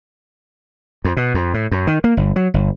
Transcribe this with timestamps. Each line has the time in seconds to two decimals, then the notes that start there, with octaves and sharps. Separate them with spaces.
1.04 F2
1.17 B2
1.34 F2
1.54 A2
1.71 F#2
1.87 D#3
2.04 A#3
2.17 G1
2.36 F#3
2.54 G1